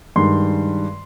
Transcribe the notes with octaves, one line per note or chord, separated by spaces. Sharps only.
G2 D#3 G#3 C6